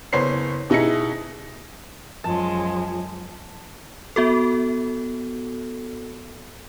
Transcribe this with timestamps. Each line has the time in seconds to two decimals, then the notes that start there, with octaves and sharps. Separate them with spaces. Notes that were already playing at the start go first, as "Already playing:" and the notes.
0.13 F#1 B3 C5 C#5 C7
0.70 B2 D#4 E4 G#4 C#7
2.24 F#2 F3 G#3 A5
4.16 B3 F#4 A4